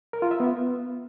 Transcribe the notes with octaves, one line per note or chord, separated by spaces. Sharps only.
A#4
F4
E5
B3